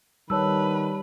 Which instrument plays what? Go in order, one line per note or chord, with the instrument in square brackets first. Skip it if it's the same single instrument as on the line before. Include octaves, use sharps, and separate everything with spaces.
[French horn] D#3 [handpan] G3 [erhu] B4 [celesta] C#5 A5 E6